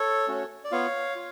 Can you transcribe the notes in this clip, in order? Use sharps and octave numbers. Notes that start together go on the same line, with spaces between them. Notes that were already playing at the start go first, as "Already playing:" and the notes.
Already playing: A4 C#5
A3 C#4 F#4
D5
B3 F4 C#5 F5
F4